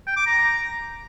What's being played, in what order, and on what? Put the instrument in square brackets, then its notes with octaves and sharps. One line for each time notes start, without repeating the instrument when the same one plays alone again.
[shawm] G5
D6
A#5